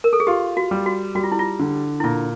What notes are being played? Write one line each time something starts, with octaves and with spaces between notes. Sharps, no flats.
A#4
A4
G#4
F4 G4
F#4
G3
F#4
G3 F#4
F4
E4
F4
D3
E4
A#2 F4